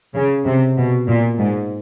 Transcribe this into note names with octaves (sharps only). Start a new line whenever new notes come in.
C#3
C3
B2
A#2
G#2